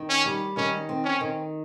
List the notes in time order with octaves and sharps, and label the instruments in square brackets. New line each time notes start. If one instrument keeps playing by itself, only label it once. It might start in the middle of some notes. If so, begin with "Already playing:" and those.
Already playing: [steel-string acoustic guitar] D#3
[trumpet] C#4
[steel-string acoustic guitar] G3
[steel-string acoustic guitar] D#3 [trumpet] C#4
[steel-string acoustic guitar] C4
[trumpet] C#4
[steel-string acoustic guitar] D#3